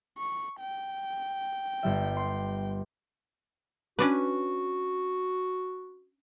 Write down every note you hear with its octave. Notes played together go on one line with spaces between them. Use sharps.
C#6
G5
G1 G3 E5
C6
C#4 D4 F#4 B4